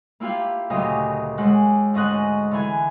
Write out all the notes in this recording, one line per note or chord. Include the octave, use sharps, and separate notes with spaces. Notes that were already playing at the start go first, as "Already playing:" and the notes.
A#3 E4 F4 G4 F5
D2 A#2 C#3 F#3 G4 D#5
D#2 G#3 F#5
D2 G#2 C#4 D#5 F#6
D3 E3 G#5